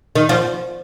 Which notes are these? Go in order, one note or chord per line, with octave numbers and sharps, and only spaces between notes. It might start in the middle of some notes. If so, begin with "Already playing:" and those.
D#3
F3